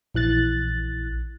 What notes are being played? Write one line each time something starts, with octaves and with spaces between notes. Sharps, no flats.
A#1 E3 F#6 A6